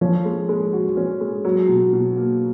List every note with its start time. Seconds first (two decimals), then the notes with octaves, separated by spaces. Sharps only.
0.01 F3 C#4
0.25 G#3
0.49 G#3
0.73 F#4
0.97 C#4
1.20 G#3
1.45 F#3
1.68 B2
1.93 B2
2.16 A#3